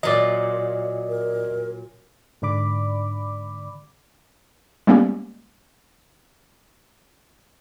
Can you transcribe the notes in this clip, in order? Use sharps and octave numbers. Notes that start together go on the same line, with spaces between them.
A#2 F#3 D5 D#5
A#4
G#2 D3 D5 B5 D6
G3 G#3 A#3 B3 C#4 G4